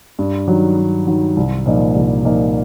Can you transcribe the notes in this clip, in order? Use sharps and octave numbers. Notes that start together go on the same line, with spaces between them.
G2
D#3 F#3
G2
D#3 F#3
C2
A#2 F3 A#3 D#4
C2
A#2 F3 A#3 D#4